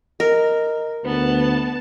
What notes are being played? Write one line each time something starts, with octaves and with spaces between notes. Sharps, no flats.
A#4 D#5
D2 B3 B4 A5